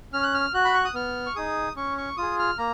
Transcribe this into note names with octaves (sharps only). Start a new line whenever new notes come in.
C#4 F6
F#6
F6
F#4 F#6
B5
C#6
D#6
B3 F6
C#6
D#4 G#4 D#6
C#4 C#6
C#6
F4 G#4 D#6
F6
A#3 A#5